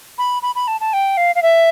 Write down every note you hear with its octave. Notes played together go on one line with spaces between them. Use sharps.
B5
B5
B5
A5
A5
G5
F5
F5
E5